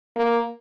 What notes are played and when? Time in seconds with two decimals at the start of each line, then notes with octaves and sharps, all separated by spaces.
0.17 A#3